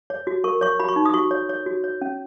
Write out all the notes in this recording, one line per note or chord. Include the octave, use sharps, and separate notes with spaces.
C#5
F#4
A#4 C#6
C#5 C#6
F#4 B5
C#6
D#4
D#6
F#4 C#6
C#5
C#5
F#4
C#5
C#4